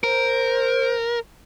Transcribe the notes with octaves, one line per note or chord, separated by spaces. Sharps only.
A#4 C5